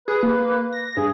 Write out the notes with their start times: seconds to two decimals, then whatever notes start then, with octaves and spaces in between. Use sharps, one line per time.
0.08 G#4 B4
0.23 A#3
0.73 A#6
0.97 G2 G#4